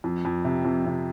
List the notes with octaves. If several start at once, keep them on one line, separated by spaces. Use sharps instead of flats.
F2
F2
C3
F2
C3